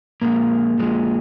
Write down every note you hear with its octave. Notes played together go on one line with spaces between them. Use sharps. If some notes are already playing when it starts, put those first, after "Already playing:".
A#2 F3 G#3 A#3
A#2 F3 G#3